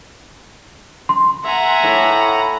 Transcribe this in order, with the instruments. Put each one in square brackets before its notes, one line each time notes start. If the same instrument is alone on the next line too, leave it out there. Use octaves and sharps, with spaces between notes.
[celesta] C6
[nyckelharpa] E5 G#5 [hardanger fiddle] F#5 A#5
[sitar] A2